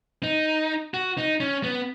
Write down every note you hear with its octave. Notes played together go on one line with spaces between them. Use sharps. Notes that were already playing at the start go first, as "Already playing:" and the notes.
D#4
F#4
D#4
C#4
B3